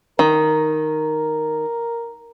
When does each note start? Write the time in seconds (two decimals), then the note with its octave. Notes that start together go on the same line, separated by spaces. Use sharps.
0.19 D#3 A#4